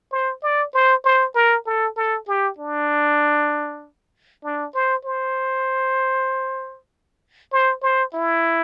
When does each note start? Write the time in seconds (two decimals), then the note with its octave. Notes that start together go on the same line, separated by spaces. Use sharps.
0.12 C5
0.43 D5
0.74 C5
1.04 C5
1.35 A#4
1.66 A4
1.96 A4
2.28 G4
2.58 D4
4.44 D4
4.75 C5
5.05 C5
7.52 C5
7.82 C5
8.14 E4